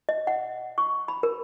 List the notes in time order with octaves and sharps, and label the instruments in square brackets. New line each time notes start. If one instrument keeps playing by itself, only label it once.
[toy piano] D#5
F#5
C#6
B5
A#4